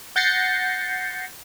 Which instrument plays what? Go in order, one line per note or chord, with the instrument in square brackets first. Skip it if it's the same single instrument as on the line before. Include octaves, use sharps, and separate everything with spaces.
[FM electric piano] F#5 G6 A6 A#6 C7 C#7